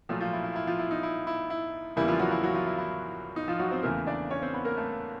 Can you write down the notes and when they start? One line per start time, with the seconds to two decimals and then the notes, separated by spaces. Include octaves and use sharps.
0.09 A#2 F3 F#3 A3 F4
0.21 F3 F4
0.33 E4
0.44 E4
0.52 F4
0.56 E4
0.67 F3 F4
0.79 E4
0.91 D#4
1.03 E4
1.27 E4
1.50 E4
1.96 E2 C#3 E3 G3 A#3 E4
2.08 F3 F4
2.19 F#3 F#4
2.31 E4
2.43 F#3 F#4
2.54 F3 F4
2.67 E4
2.78 E4
3.36 D#4
3.48 F3 F4
3.59 F#3 F#4
3.71 C4 C5
3.83 E2 C#3 E3 A3 A#3 A#4
4.07 D4 D5
4.30 C#4 C#5
4.42 C4 C5
4.53 B3 B4
4.65 A#3 A#4
4.77 A3 A4